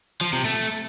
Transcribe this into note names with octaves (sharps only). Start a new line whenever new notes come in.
F3
C3
A3